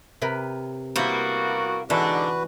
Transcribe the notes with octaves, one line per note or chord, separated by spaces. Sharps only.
C3 A#4 B4
G3 A#3 B3 E4 F#4 C5
G#2 D3 E3 D4 F#4 B4